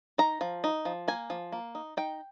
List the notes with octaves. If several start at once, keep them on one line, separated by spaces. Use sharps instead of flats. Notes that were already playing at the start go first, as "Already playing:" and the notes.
D#4 A#5
F3
D#4
F3
A#3 G#5
F3
A#3
D#4
D#4 G5